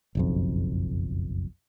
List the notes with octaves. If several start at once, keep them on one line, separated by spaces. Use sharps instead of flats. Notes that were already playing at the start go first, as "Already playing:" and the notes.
F#1 B1 F2